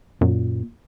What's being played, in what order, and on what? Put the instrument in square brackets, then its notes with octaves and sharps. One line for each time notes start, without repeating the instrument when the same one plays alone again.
[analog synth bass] F#2 [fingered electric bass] A#2